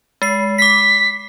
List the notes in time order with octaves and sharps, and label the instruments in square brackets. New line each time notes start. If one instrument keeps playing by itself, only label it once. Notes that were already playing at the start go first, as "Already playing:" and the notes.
[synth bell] G#3 C7
[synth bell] D6 C7 [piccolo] B6